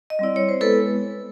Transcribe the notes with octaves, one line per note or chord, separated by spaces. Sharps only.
D#5
G3 C4 E4 D5
C#5
C5
G#3 B3 E4 A4 B4